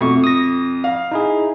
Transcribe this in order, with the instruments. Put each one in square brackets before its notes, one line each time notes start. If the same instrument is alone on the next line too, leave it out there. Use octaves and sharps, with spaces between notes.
[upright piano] F2 [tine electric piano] B2 A3 C#6
[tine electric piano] D#6 A#6
[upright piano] F5
[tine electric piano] D#4 E4 G#4